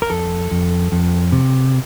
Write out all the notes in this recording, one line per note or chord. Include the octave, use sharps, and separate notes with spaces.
A#4
F2 A4
F2
F2
C3